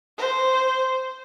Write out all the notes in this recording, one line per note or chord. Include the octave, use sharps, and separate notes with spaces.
C5